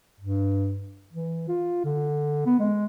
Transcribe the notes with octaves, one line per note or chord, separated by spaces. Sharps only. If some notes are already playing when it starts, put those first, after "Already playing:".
G2
E3
F4
D3
B3
G#3